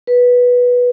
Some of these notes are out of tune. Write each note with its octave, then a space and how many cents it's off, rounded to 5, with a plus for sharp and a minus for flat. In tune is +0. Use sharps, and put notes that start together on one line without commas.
B4 -10